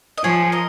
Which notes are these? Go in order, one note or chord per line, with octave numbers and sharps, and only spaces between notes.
D#5
F3 G#4 C#5
A#4 D#5